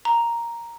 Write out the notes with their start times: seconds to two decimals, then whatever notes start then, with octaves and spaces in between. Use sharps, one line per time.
0.05 A#5